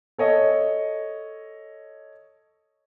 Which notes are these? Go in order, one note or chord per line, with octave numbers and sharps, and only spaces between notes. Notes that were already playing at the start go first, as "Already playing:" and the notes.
A4 C#5 D#5